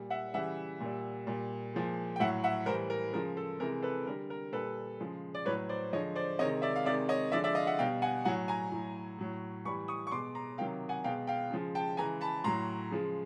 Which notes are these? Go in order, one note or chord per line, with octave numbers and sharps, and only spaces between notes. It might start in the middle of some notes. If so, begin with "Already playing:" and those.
Already playing: A#2 G3
E5 F#5
C#3 E3 G3 E5 F#5
A#2 G3
A#2 G3
A#2 F3 G#3
G5
A2 F#3 E5 F#5
E5 F#5
A2 E3 G3 A#4 C5
A#4
C#3 F3 G#3 A#4
A4
C3 E3 G#3 A#4
A4 B4
D3 G3 A#4
A#4
A#2 G3 A4 B4
C#3 F3 G#3
D5
A2 F#3 B4 C#5
C5 D5
D3 F3 G#3 C#5 D#5
C5 D5
C3 D#3 G#3 C#5 D#5
D5 E5
F5
C3 D#3 G#3 D5 E5
C#5 D#5
D3 F3 G#3 D5 E5
D5 E5
D#5 F5
E5 F#5
B2 G3 F5 G5
F#5 G#5
A2 F#3 F#5 G#5
G#5 A#5
A2 F#3
A2 F#3
A2 E3 G3 B5 C#6
C#6 D#6
C#6
B2 G#3 C6 D6
A#5 C6
C3 D#3 F#3 F5 G5
F#5 G#5
B2 G#3 F5 G5
F5 G5
C#3 F3 G#3
G5 A5
C#3 E3 G#3 G#5 A#5
A5 B5
A2 F#3 A#5 C6
C#3 F3 G#3